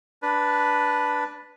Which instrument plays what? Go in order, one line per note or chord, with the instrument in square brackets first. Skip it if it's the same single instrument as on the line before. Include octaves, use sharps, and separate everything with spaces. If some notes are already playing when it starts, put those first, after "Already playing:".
[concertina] D4 B4